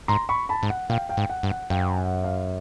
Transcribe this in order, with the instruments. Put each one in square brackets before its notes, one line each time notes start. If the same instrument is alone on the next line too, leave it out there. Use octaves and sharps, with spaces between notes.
[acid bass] G#2 [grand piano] A#5 C6
[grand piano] B5 C#6
A5 B5
[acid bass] G#2
[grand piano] F#5
[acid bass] A#2 [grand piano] F5 G5
[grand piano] F5 G5
[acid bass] G#2
[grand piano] F#5
[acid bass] G2
[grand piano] F#5
[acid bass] F#2 [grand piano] F5 G5
[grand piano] F#5
F5